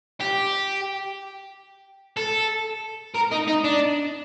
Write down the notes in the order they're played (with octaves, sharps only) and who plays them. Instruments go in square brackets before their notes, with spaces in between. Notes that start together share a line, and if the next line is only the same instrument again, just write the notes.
[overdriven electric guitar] G4
A4
A#4
D#4
D#4
D4